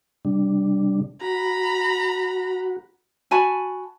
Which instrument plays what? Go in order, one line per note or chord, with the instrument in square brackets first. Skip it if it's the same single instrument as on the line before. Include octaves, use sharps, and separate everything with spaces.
[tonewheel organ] C3 G3 D4
[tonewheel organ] F#4 [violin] A#5 B5
[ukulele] F#4 G#5 A5 B5